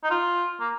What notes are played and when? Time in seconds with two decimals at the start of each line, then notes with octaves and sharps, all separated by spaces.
0.04 D#4
0.11 F4
0.60 A#3